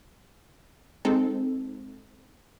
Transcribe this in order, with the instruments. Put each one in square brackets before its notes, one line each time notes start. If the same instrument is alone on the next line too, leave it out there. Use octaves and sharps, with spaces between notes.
[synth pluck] G#3 C4 D#4 A4